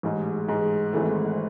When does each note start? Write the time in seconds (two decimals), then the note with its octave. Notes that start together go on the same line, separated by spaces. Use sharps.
0.03 A1 G#2 G#3
0.48 A1 G#2 G#3
0.93 G#1 G#2 E3 A3